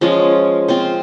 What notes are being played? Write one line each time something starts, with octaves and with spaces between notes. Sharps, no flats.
F3 G#3 C#4 F4
C4 F4 C5